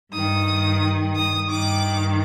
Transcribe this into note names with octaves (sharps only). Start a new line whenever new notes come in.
G2 D#3 D#6
D#6
G2 D#3 D6